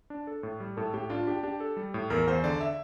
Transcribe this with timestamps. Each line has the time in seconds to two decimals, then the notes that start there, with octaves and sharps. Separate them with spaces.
0.10 D4
0.27 A4
0.43 A2
0.60 G3
0.77 A2 A4
0.93 A2 G4
1.10 D4 F4
1.27 D4 G4
1.43 D4 G4
1.60 A4
1.77 G3
1.94 A2
2.10 E2 A#4
2.27 E2 C5
2.44 D3 D5
2.61 E5